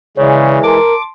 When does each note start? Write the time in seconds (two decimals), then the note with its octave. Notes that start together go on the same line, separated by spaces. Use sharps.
0.17 C#3 E3 G#3 C#5 D5
0.63 A#4 A5 C6 D6